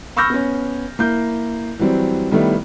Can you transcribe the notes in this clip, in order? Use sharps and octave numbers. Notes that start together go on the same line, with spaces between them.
B5 C#6 E6 F6 G6 A#6
B3 C#4
A#3 E4 G6
E3 F#3 G3 C4
D#3 G3 A3 B3 E4